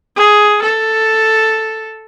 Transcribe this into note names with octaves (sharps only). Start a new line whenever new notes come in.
G#4
A4